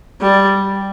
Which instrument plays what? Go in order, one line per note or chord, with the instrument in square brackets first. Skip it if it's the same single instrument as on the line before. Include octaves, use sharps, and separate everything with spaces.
[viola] G3 [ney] D5